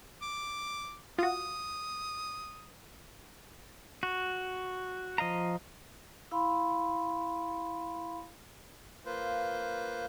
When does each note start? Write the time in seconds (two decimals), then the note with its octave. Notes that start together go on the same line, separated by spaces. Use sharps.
0.21 D6
1.18 F4 F#4 D#6
4.03 F#4
5.18 F3 D#5 F5 A#5
6.31 E4 F5 B5 C6
9.06 A#3 F4 B4 C5